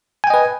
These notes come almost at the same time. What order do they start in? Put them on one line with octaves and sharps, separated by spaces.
G#5 G5 D#5 B4